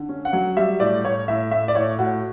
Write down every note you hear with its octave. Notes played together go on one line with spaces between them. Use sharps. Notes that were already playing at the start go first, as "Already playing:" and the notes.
Already playing: D3
C#4
F#5
F#3
G3 E5
A2 D5
A2 C#5
A2 E5
A2 E5
D5
A2 C#5
A2 F#4